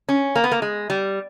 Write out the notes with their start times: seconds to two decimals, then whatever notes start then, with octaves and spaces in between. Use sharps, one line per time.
0.09 C#4
0.36 A#3
0.44 B3
0.52 A#3
0.62 G#3
0.90 G3